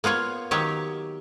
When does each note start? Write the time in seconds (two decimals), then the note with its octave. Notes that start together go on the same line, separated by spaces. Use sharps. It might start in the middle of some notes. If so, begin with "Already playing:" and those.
0.04 A#3 B3 F4 C#5
0.51 D#3 F#3 G4 C#5